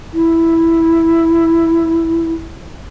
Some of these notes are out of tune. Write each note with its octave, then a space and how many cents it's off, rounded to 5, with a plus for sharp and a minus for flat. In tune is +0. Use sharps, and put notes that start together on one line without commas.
E4 +0